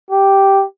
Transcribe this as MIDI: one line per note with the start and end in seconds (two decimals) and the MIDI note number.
0.10 0.64 67